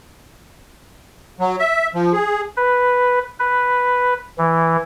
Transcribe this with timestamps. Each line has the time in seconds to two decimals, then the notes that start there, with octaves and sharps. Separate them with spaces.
1.40 F#3
1.60 E5
1.95 F3
2.13 G#4
2.57 B4
3.39 B4
4.38 E3